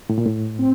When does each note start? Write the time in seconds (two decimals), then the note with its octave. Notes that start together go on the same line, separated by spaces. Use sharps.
0.09 A2
0.18 A#2
0.26 A2
0.59 C4